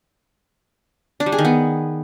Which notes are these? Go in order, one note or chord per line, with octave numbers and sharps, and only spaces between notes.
D4
G3
G#4
D#3
B3